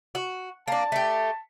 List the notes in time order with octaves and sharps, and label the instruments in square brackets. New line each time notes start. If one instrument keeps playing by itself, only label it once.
[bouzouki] F#4
[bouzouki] A#3 D4 [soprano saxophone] A5
[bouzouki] A3 G4